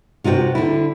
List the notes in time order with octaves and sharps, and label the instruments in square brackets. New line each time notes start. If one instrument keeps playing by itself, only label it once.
[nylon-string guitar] C3 F4 F#4 D#5 G5
D3 E4